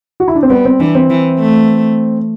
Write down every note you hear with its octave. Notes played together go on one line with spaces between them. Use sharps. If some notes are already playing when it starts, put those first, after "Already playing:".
F#4
E4
D4
C4
G3 B3
C4
E3 D4
C4
E3
A3